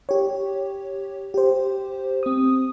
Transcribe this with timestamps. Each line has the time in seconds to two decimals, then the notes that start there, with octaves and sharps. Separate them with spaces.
0.09 G4 C#5
1.34 G4 C5
2.23 C4 D#6